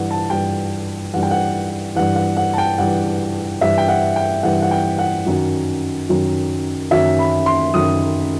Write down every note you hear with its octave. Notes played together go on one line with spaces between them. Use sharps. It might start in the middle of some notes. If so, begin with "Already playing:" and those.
Already playing: G2 E3 F#5
A5
G2 E3 G5
G2 E3 F#5
G5
F#5
G2 E3 F#5
F#5
F#5
A5
G5
G2 E3 F#5
G2 E3 E5
G5
F#5
G5
G2 E3 F#5
F#5
G5
F#5
F#2 D#3 F#3
F#2 D#3 F#3
F#2 D#3 F#3 E5
B5
C6
F#2 D#3 F#3 D#6